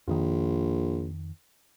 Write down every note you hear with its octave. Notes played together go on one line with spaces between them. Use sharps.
A#1 F2 D#3